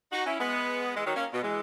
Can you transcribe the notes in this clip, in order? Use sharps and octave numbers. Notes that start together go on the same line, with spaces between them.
D#4 F#4
C#4 E4
G#3 B3
E3 G#3
D#3 F#3
A#3 C#4
B2
E3 G#3